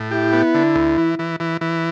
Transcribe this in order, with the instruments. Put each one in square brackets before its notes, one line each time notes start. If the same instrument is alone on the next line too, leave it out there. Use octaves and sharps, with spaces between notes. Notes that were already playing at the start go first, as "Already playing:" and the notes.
Already playing: [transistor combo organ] A2
[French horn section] E4 [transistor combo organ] G4
[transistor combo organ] B3
D3
D2
E3
E3
E3
E3